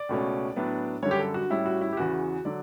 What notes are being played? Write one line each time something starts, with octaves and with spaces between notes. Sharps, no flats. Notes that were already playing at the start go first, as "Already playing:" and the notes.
Already playing: D5
C#2 B2 A3 C#4
A2 F#3 B3 D4
F#2 D3 G3 C#5
G4
A4
F#4
A2 G3 C#4 E4
F#4
E4
G4
E2 C#3 E3 F#4
D3 F#3 D5